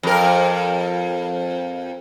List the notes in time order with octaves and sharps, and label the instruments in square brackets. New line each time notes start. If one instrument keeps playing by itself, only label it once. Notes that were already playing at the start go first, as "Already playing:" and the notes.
[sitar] F2 A#4